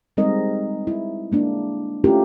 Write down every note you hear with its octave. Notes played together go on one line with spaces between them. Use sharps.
G3 G#3 C4 D#4 A#4 D#5
E4
G#3 A#3 D4
A3 C#4 E4 F4 G4 A#4